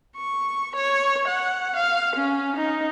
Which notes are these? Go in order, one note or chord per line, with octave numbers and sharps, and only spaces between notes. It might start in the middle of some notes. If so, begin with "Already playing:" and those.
C#6
C#5
F#5
F5
C#4
D#4